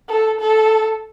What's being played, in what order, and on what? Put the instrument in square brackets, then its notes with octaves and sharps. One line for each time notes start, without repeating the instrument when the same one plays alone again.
[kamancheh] A4
A4